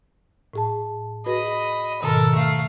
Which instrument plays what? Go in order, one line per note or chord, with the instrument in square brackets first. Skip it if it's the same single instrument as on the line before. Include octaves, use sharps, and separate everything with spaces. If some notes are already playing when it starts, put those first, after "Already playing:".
[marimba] A2 G#4 A5
[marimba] F#4 G#4 B4 [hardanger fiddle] D#5 B5
[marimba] G#2 B2 D#3 [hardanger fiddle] A4 A#4
[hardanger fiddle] A3 F5